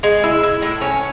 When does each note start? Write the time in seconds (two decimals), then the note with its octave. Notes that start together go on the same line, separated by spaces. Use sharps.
0.03 G#3
0.24 E4
0.43 E4
0.62 A2
0.81 C#4